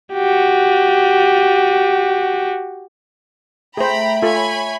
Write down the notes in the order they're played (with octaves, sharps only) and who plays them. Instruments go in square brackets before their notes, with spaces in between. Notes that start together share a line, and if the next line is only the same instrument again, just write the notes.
[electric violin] F#4 G4
[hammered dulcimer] A3 [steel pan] G#4 C5 [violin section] G5 A#5 B5
[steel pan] F4 A4 [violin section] C#5 G#5 B5